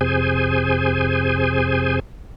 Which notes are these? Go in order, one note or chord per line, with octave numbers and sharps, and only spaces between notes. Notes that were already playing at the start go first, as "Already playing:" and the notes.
F2 C3 G#4 C5 G#5